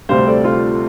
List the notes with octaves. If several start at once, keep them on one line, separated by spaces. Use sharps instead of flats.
D2 C3 G3 C5 F5
A4 D5
F4 A4